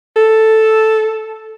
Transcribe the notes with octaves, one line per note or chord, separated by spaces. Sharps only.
A4